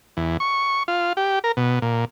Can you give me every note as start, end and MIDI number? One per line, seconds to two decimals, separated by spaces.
0.17 0.37 40
0.40 0.83 85
0.88 1.13 65
1.17 1.39 67
1.44 1.52 70
1.57 1.79 47
1.82 2.05 46